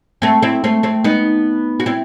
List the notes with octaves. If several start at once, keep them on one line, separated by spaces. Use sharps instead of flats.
A3 C4
C4 E4
A3 C4
A3 C4
B3 D#4
F#4
C4 E4